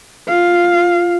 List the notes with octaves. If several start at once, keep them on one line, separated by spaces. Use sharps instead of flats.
F4 F5